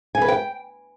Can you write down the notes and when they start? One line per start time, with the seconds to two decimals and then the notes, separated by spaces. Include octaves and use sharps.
0.15 G#5
0.22 B4
0.28 G5